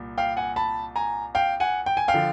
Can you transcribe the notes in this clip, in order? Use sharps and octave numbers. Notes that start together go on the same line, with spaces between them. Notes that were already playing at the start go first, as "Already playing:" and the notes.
Already playing: C2 A#2
F5 G5
F#5 G#5
A5 B5
G#5 A#5
F5 G5
F#5 G#5
G5
G#5
F5 G5
D3 F3